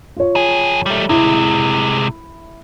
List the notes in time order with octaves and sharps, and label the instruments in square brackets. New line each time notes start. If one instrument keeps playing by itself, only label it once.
[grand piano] F4 C#5
[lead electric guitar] F2 G#4
G3 A3
[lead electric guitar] C3 G#3 [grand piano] E4